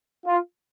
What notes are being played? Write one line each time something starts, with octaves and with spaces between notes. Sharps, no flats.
F4